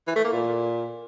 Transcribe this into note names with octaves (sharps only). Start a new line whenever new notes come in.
E3
A3
A#3
A#2